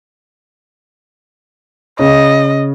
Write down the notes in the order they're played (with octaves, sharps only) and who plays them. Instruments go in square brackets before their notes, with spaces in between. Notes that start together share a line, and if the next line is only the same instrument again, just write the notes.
[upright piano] C#3 [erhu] D#5